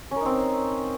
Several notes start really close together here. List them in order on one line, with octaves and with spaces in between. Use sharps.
C#4 A#4 D#4 C4